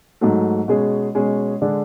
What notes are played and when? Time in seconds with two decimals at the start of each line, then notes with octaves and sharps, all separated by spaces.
0.21 G#2 F#3 A3
0.68 B2 G#3 C#4 G#4
1.15 B2 G#3 C#4 G#4
1.61 D3 G#3 D4 G#4